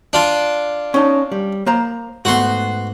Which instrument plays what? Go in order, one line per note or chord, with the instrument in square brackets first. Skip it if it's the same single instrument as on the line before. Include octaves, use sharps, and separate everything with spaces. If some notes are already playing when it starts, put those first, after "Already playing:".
[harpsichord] D4 F4
[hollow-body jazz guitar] C#4 D#4 A5
G3
A#3 C5 A#5
[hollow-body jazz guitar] G#2 A3 B3 [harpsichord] F#4 C6